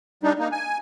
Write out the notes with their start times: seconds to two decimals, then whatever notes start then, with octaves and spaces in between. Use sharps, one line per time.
0.23 G3 D4 D#4
0.39 A#3 D#4
0.52 G#5